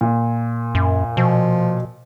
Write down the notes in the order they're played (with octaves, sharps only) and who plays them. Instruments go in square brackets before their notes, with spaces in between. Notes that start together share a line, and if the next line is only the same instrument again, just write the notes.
[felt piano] A#2
[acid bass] F#2
[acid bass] B2 [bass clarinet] F3